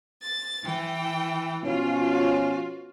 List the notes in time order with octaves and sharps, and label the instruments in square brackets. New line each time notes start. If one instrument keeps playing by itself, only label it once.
[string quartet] A6
E3 G5
[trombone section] B2 F3 C#4 [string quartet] F4 F#4